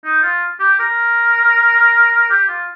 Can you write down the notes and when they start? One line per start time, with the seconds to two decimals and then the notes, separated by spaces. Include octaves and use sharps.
0.04 D#4
0.22 F4
0.60 G4
0.80 A#4
2.30 G4
2.48 F4